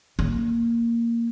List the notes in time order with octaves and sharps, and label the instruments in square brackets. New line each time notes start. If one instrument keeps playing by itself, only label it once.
[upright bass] A#3